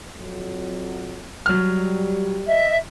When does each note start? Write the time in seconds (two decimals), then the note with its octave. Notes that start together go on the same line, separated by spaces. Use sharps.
0.17 F2 F#3
1.46 F#3 G3 F6
2.47 D#5 E5